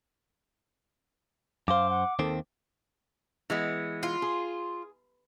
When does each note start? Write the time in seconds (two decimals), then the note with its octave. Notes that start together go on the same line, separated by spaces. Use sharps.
1.68 F#2 C5 F5 D6
1.89 F#5
2.19 D#2 D#3 C4 A4
3.50 E3 G#3 B3
4.03 F4
4.22 G#4